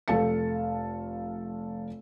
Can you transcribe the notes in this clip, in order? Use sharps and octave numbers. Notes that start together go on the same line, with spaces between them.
F1 A4 F5 A5 C#7